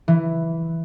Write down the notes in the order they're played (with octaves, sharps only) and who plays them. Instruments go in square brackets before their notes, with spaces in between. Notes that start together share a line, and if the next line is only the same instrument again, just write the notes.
[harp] E3